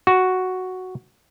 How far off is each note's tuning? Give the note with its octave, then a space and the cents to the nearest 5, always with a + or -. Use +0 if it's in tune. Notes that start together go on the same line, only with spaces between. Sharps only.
F#4 +0